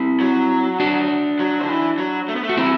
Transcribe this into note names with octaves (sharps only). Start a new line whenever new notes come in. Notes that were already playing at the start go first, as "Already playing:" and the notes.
Already playing: C4 E4
F#3
D4 F#4
F#3
D3
E3
F#3
A3
B3
A3
F#4
E3 C4 E4